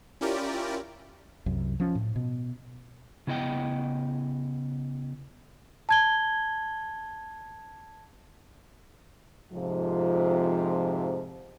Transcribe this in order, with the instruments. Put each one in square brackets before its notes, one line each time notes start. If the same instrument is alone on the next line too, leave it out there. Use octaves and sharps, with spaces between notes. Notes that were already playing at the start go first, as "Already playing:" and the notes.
[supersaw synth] C#4 E4 F4 G4 A#4 D5
[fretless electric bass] C2 F#2
F3 C#4
A2
B2
[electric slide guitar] C#3 B3 E4 D#5 F#5 G5
[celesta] A5 G#6 G7
[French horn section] F2 G#2 C3 F3